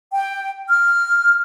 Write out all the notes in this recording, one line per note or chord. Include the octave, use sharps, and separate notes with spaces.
G5
F6